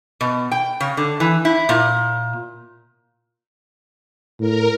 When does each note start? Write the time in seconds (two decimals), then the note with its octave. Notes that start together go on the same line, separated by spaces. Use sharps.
0.21 B2
0.52 G5
0.80 C#3
0.97 D3
1.20 E3
1.45 E4
1.69 A#2
4.40 A2 A#4